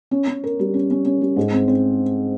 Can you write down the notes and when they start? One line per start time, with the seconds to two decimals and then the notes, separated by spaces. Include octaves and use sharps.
0.11 C#4
0.27 C#4
0.44 A#4
0.59 G3
0.74 C#4
0.91 C#4
1.05 C#4
1.21 G3
1.36 G#2
1.52 C4
1.68 C4